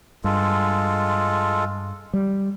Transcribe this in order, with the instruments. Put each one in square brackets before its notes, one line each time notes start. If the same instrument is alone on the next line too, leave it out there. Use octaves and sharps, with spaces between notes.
[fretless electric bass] G2 [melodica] G#3 F4 A4
[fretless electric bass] G3